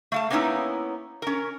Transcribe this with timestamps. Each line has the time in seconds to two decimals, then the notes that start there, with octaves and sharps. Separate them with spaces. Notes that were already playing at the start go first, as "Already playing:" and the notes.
0.12 A3 F5 A5
0.30 A#3 B3 C#4 D#4 E4 B4
1.22 C#4 A#4